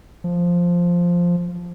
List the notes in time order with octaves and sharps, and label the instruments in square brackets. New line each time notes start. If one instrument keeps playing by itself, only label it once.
[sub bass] F3